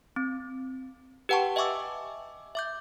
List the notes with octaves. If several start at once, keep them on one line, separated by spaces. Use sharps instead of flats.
C4
G4 B4 F#5 G5 A5 C#6
D#5 E5 G#5 C#6 D6 E6
E5 D6 G6